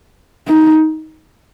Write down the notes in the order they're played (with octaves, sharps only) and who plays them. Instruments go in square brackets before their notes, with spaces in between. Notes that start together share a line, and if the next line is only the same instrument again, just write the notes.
[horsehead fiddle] D#4